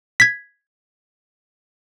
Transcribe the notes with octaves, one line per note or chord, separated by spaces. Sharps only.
G#6 B6